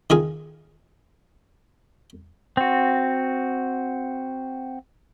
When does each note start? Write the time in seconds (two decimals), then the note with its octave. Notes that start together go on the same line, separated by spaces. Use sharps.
0.10 D#3 F4 G#4
2.57 C4 F#4